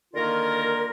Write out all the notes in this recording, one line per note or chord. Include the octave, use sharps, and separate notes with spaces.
D3 D#3 A#3 F4 A#4